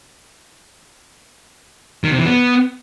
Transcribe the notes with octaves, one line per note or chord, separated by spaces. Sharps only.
D#3
C3
E3
B3